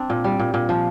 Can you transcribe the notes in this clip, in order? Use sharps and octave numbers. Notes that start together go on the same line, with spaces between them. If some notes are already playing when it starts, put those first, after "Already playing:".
Already playing: C4 D4
A#2
G3
A#2
A#2
F3